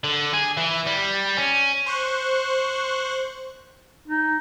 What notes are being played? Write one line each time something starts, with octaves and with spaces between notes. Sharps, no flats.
D3
G#4
E3
G3
C#4
C5 C#6 F#6
D#4